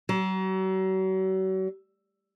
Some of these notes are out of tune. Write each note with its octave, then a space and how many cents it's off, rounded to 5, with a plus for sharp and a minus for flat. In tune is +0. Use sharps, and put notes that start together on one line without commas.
F#3 +40